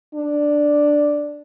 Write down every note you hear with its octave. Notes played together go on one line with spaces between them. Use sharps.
D4